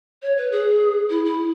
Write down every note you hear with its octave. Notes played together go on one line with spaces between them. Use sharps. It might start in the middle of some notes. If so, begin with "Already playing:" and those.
C#5
B4
G#4
E4
E4